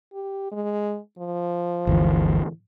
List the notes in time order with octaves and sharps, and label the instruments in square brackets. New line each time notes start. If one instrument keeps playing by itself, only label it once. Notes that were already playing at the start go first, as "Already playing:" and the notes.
[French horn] G4
G#3
F3
[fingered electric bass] G1 D2 E3